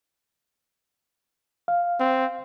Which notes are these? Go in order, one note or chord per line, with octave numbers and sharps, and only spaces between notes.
F5
C4